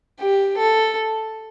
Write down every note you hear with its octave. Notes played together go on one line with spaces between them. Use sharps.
G4
A4